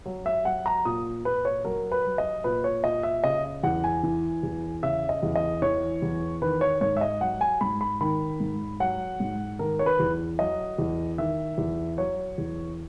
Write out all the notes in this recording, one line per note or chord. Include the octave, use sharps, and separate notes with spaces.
F#3
E5
F#3 F#5
A#5
A#2 D#6
A#2 B4
C#5
F#3 A#4
B4
F#3
D#5
A#2 B4
C#5
A#2 D#5
E5
C#3 D#5
E2 F#5
G#5
E3
E2
C#3 E5
D#5
E2
D#5
E3 C#5
E2
D#3 B4
C#5
G#2 C#5
E5
D#5
F#3 F#5
G#5
G#2 B5
B5
D#3 B5
G#2
F#3 F#5
G#2
D#3 A#4
C#5
B4
E2
F#3 D#5
E2
D#3 E5
E2
F#3 C#5
E2